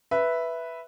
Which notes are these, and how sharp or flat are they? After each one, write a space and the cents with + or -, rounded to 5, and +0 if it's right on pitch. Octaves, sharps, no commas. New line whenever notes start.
B4 +0 E5 +0